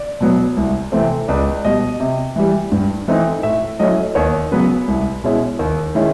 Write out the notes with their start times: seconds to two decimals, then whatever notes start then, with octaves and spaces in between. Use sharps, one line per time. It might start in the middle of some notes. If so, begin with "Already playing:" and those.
Already playing: D5
0.21 B2 F#3 B3
0.57 C2
0.92 C3 E3 A3 C4
1.28 C#2 D5
1.65 B2 G3 D#5
2.00 C3
2.36 E3 G3
2.72 G2
3.08 E3 A3 C4 D#4
3.43 A2 E5
3.80 F#3 A3 C#4 E4 D#5
4.15 D#2 C#5
4.52 C#3 F#3 B3 B4
4.88 C2
5.24 B2 G#3 C#4 E4
5.59 D#2
5.95 D#3 G#3 C#4 E4